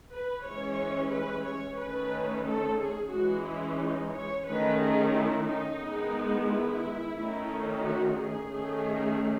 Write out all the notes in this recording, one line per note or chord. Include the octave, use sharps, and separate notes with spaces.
B4
E3 G#3 C#4 C#5
B4
C#5
D#3 A3 C#4 B4
A4
G#4
E3 G#3 C#4 F#4
E4
D#4
C#5
D#3 A3 C#4 B4
G#4
E4
D#4
D#3 G#3 B3
E4
D#3 A3 C#4
F#4
G#4
D#3 A3 C#4